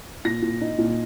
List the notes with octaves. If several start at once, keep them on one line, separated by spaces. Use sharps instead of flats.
A#2 A#6
A#2
D#4
A#2